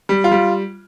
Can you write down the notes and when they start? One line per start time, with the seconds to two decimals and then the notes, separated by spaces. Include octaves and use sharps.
0.09 G3
0.24 F4
0.31 G3